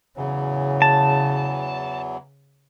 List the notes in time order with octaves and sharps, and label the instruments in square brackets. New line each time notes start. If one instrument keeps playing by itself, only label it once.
[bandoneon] E2 E3 F#3 [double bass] C#3
[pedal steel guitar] A5